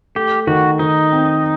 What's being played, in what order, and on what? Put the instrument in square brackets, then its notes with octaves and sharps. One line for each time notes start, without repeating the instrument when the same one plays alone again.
[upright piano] A3 [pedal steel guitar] G4
[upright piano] D#3 [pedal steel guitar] F#4
[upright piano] D#3 [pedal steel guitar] D#4
[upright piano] C4